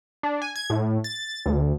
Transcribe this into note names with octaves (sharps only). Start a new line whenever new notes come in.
D4
G#5
G#6
A2
A6
D2